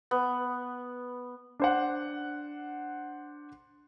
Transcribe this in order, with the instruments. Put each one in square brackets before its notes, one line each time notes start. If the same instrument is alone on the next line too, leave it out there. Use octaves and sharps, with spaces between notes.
[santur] B3
[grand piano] D4 C5 F#5